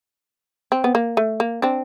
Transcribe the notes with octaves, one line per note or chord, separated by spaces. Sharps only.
C4
B3
A#3
A3
A#3
C4 D4